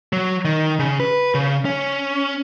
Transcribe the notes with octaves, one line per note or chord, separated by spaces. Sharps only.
F#3
D#3
C#3
B4
C#3
C#4